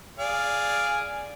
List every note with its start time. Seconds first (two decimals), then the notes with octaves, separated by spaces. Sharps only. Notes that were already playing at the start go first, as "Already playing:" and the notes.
0.19 G#4 D5 F5